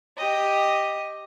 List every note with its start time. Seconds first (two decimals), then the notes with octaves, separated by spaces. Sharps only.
0.18 G4 D#5